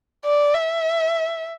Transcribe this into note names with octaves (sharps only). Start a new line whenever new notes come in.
D5
E5